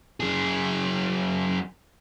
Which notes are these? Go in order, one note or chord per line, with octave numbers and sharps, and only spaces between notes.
F#2 G#4